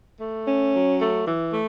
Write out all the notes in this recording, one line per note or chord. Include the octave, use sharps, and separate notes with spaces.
A3
C#4
F#3
A3
E3
A3